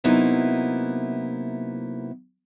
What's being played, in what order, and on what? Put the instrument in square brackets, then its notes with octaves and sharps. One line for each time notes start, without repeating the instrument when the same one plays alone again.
[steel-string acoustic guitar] C3 F#3 A#3 B3 D#4 E4